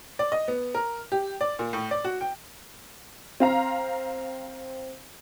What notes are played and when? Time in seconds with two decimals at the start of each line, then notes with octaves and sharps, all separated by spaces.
0.19 D5
0.32 D#5
0.48 B3
0.75 A#4
1.12 G4
1.41 D5
1.59 A#2
1.73 A2
1.91 D5
2.04 F#4
2.21 G5
3.40 C4 F5 A#5